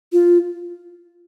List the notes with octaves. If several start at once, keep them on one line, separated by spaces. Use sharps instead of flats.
F4